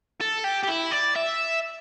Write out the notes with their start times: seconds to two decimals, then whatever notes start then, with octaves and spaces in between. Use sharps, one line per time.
0.21 A4
0.44 G4
0.64 G4
0.68 E4
0.92 D5
1.16 E5